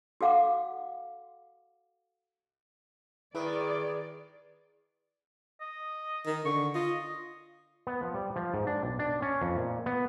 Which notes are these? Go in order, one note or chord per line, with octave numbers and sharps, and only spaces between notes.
F#4 A4 F5 F#5 D6
D#3 G#3 E4 B4 D5 D6
D#5
D#3
D3 C#6
F4 D#5
B3
F3
G3
F3
G#2
D4
B1
D4
C#4
F2
A#2
B3